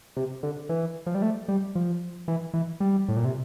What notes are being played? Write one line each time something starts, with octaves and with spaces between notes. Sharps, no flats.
C3
D3
E3
F3
G3
A3
G3
F3
E3
E3
G3
A2
A#2
C3